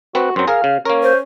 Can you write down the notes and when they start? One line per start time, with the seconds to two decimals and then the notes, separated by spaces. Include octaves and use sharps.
0.15 C4 F#4 B4 F#5
0.36 F#2 F#3 C4
0.47 G#4 A#4 F5
0.64 C#3
0.85 A#3 C#4 A#4
1.03 C5